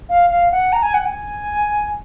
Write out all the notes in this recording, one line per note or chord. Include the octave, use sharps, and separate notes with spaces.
F5
F5
F#5
A#5
G#5
F#5
G#5